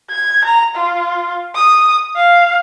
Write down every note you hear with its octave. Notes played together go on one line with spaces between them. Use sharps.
G#6
A#5
F4
D#6
F5